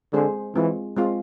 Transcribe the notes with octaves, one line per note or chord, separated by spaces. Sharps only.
D3 G#3 C4 G#4 C5
E3 G#3 C4 F4
G#3 C4 F4